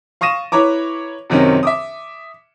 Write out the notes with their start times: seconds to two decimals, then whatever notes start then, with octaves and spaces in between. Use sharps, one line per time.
0.21 F5 C#6 D#6 A#6 D#7 E7
0.52 E4 B4 C#5 A#5 D6
1.30 F#2 C3 D#3 C4 C#4
1.63 E5 D6 D#6